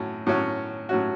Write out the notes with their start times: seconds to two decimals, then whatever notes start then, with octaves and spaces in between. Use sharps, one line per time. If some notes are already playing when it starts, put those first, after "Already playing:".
Already playing: A2 F#3 C#4
0.26 A2 F#3 C#4 F#4
0.89 A2 F#3 C#4 F#4